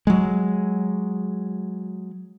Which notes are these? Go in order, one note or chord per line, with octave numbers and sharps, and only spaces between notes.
F#3 G#3